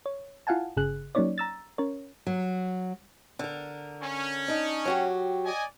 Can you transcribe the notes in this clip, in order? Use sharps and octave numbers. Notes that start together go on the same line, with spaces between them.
C#5
E4 F4 F5 F#5 G#5 A5
G1 C#3 G#4 F#6
F#3 A#3 C#4 D#4 C#5 D5
A#5 E6 A6
C#4 A#4 C#5
F#3
D3 A#4
C#4
D4 D#4
F#3 F#4 G4
D5 D#5 G#5